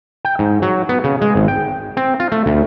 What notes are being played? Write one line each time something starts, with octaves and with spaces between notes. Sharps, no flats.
G5
G#2
F#3
B3
C#3
G#3
G#1
G5
C4
F4
A3
D2